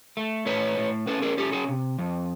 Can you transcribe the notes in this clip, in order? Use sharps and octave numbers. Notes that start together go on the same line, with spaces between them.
A3
A2 B4 C#5
A2
C#4 A4 B4
G#4 A#4
C#4 G4 A4
F#4 G#4
C3
F2